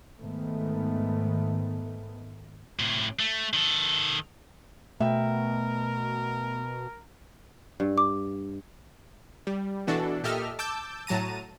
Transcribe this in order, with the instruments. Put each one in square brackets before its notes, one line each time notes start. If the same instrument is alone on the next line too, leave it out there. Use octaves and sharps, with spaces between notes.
[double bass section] G#2 D#3 A3 B3
[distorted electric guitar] A2 C3
A3
D#3 A4
[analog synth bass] B2 [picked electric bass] A3 [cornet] A#4 [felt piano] E5 G5
[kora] G2
[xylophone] D6
[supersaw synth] G3
B2 E3 D4 F#4 A4
A#2 G4 A4 D#5 E5 F6
A5 D6 E6 G6
A2 F#3 A5 A#5 D#7